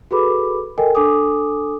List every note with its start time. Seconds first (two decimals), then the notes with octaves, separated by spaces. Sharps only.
0.11 F#4 G#4 A4 B4 B5 D6
0.78 A4 A#4 D#5 G5 G#5
0.95 D4 A4 G#5 D6 D#6